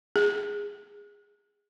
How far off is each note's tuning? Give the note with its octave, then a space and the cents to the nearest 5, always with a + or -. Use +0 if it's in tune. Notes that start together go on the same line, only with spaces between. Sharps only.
G#4 -15